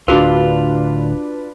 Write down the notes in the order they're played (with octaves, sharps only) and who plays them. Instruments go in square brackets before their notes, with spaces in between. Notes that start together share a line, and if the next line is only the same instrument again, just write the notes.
[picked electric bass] D1 D2 [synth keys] D4 B4 [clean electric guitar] F4 [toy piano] F#4 G#4 A#4